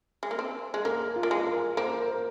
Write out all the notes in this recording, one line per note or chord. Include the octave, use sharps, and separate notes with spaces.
G#3
A#3
C4
G#3
A#3 A#4
F4
A#3
G#3
A#4
A#3 C5
A#4